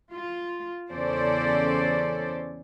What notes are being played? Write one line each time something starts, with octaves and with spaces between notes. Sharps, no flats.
F4
E2 C#3 C#4 A4 C5 D5